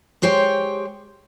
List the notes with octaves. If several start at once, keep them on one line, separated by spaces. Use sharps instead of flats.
G#3 G4 C5 C#5 G5